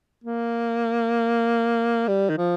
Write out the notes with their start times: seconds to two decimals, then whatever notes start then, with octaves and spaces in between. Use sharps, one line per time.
0.24 A#3
2.08 G3
2.29 D#3
2.37 F3